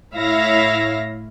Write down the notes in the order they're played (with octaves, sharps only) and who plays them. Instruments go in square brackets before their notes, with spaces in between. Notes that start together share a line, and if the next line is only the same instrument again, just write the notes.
[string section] A2 E4 C#5 E5 F5 A#6